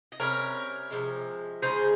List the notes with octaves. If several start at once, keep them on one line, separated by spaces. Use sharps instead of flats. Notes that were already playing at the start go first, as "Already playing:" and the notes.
D#5
C3 G3 C#4 A#4 C#5
C3 F3 G#3
C#3 G#3 D#4 G#4 C5